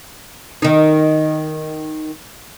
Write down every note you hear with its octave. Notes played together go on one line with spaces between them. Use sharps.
D#3 D#4